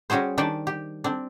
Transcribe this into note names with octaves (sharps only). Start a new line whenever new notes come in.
G3 C#4 F#4 G#4 C5
D#3 G3 D4 G5 A5
G4
C4 D4